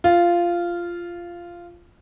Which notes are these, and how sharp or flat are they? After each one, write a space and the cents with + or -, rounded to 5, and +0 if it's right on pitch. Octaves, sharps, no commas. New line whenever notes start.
F4 -10